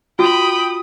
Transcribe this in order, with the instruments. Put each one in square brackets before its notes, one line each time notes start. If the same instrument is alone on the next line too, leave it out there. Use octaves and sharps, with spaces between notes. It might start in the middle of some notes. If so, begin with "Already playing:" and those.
[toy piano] F4 F#4 [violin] G5 B5 [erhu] D#6